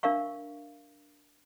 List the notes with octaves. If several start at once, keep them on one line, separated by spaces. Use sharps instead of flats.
D4 A#4 E5 F5 C#6